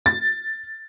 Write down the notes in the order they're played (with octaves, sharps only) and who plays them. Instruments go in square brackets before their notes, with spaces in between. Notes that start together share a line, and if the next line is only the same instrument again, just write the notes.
[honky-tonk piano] A6